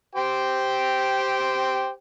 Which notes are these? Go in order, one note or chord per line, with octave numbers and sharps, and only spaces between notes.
G4 C5 G5